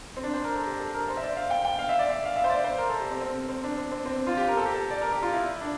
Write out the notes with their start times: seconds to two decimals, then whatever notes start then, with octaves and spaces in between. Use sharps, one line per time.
0.17 C4
0.24 D4
0.34 C5
0.44 A#4
0.55 A4
0.66 G4
0.80 A4
0.94 A#4
1.08 C5
1.17 E5
1.22 D5
1.37 F5
1.51 G5
1.65 G5
1.79 F5
1.89 E5
1.99 D5
2.09 E5
2.25 F5
2.36 E5
2.44 C5
2.50 D5
2.64 C5
2.78 A#4
2.89 A4
3.00 G4
3.11 C4
3.21 C4
3.49 C4
3.64 D4
3.77 C4
3.91 C4
4.06 C4
4.27 F4
4.37 G4
4.48 A#4
4.57 A4
4.66 G4
4.74 A4
4.91 D5
5.02 A#4
5.12 G4
5.23 F4
5.34 E4
5.61 D4